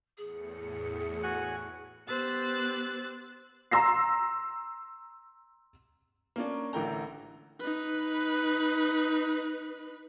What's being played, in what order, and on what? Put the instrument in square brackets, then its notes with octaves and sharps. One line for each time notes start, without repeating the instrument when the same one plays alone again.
[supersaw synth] E2 A2 C#7 [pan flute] G#4
[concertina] F#4 G#5 F#6
[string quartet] B3 G4 C5 E6 F#6 A6
[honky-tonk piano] A#5 C6 E6 A#6 C7
[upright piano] A#3 C#4 D4
A1 D3 E4 A#4 G5 A#5
[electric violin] D#4 B4